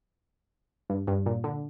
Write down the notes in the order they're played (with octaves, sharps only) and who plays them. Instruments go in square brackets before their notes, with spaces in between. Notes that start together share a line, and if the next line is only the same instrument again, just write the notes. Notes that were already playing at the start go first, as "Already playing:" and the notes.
[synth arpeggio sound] G2
G2
A#2
D3